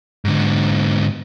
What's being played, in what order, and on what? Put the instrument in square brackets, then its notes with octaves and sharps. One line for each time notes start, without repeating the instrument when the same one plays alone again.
[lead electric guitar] G#2 D3